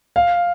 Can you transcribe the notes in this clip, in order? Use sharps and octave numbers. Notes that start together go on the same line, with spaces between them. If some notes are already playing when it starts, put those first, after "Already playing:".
F5